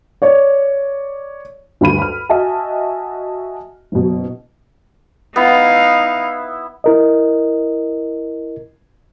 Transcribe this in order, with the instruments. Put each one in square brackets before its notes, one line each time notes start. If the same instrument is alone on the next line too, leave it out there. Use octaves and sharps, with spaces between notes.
[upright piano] C#5 D5
[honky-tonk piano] D2 G2 B5 D#7
B5 F6
F#4 D#5 E5 G#5 A5
F#1 B2
[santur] B3 E4 [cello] D#4 F5
[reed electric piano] E4 A#4 D#5